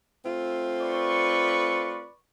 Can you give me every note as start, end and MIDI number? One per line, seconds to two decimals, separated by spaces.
0.25 2.06 57
0.25 2.06 60
0.25 2.06 65
0.80 2.14 71
0.80 2.14 74
0.80 2.14 85